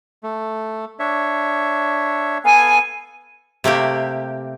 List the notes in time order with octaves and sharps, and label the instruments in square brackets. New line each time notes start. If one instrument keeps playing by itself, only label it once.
[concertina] A3
D4 C#5 E5
[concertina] B3 A4 F5 [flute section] G#5
[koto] C3 A3 A#3 G4